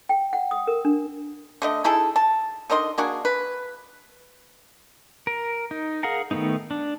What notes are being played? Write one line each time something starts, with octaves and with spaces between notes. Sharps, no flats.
G5
F#5
D#6
A#4
D4
D3 A3 D#5
D#4 E4 G#4 A4
A5
D3 D#3 D#5 C6
A#3 D4 F#4 G#4
B4
A#4
D#4
G#4 A#4 F5 F#5 A#5
D#3 F3 A3 B3 D#4
D4